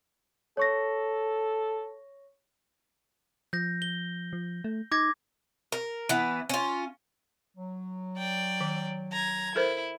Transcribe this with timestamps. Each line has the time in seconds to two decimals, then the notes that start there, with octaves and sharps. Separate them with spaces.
0.57 A4 C#5 C#6 A#6
3.53 F3 G6 A#6
3.82 G7
4.33 F3
4.64 A3
4.92 D#4 D6 G#6 A#6
5.72 A#4
6.09 E3 B3
6.49 C#4 F4
7.57 F#3
8.18 D5 G5
8.61 D#3
9.13 A#5 G#6
9.56 E4 A4 A#4 C5